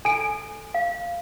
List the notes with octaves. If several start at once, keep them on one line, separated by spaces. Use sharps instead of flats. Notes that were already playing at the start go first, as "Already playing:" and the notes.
A4 G#5 D7
F5